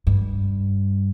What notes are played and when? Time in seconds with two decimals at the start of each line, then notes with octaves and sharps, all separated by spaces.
0.07 G2